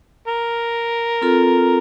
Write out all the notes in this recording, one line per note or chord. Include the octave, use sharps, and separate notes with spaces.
A#4
C4 F4 A4